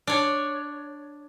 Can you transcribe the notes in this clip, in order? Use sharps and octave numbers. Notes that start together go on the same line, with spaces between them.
D4 C#5